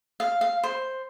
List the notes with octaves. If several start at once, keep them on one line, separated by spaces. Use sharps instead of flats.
F5
F5
C5